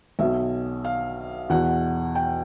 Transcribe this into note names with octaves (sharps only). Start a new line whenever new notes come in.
B1 B2 E5
F5
E2 B2 F#5
G5